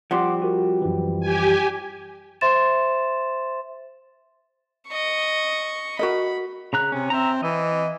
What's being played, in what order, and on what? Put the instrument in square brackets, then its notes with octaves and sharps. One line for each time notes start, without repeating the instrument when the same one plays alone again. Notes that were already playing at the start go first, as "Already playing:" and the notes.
[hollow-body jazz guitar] F3 G3 C4 [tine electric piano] F#5 C6 D6
[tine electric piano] F#4 A#4
F#2 E3
[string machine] G4 G#5
[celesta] C5 E5 C6 A6 E7
[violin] D#5 C#6
[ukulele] F#4 A#4 D#5 [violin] B5
[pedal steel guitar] C#3 A#5 F#6
[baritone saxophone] C3 [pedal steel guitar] C#4
[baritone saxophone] C4 [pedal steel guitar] E5 A#5
[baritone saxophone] E3 [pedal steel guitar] D#5